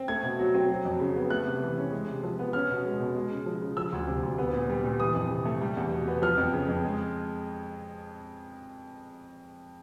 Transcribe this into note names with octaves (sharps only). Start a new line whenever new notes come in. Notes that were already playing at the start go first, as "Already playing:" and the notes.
Already playing: C4
A3 G#6
B2
F#3
C4
F#3
F2
C#3
B3
A3 F#6
C3
E3
C#4
G#3
C3
F3
B3
C#4 F6
B2
G#3
B2
G#3
C#3
F3
C#3
F3 E6
D2
C3
D2
B3
A#2
G3
A#2
E3 D#6
F2
C3
A3
G3
E2
B2
B3
F3 F6
F2
C#3
F2
G#3